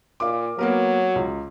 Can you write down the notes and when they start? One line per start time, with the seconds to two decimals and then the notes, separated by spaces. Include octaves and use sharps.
0.20 A#2 F5 D6
0.59 F#3 A#3 B3 A#4
1.15 C#2